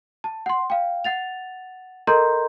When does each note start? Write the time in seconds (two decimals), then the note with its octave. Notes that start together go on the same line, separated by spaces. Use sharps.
0.24 A5
0.46 F#5 C6
0.70 F5 G5
1.04 F#5 A6 F7
2.07 A4 A#4 D#5 A#5 C6 G6